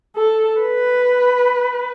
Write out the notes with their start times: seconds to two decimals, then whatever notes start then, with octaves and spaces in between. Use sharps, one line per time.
0.16 A4
0.61 B4